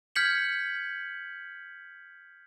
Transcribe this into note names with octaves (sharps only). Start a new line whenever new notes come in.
F6 G6 G#6 B6 C#7 F#7